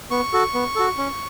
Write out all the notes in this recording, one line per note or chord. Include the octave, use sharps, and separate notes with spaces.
B3 C#6
F#4 A4
B3
F#4 A4
C#4